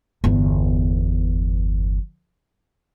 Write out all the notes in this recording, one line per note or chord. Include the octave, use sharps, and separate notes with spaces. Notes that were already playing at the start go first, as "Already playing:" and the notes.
G1 E2